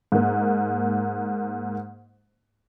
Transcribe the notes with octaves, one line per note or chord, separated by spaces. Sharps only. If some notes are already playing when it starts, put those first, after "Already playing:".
G#2 A#3